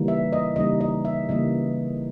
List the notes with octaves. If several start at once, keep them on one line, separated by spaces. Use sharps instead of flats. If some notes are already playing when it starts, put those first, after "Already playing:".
Already playing: C#3 E3 G3 A#3 D#4
E5
D#5
C#3 E3 G3 A#3 D#4 D#5
D#5
E5
C#3 E3 G3 A#3 D#4 D#5